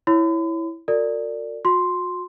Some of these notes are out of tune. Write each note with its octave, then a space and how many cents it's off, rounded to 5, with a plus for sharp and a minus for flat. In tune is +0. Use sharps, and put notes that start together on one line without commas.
E4 +0 C#5 +0 B5 +45
F#4 -20 A#4 -40 D5 +0
F#4 -40 C6 +0